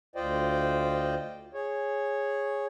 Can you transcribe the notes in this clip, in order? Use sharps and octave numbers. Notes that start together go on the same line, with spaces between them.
D2 F4 C5 D5 D#5 G5
G#4 C#5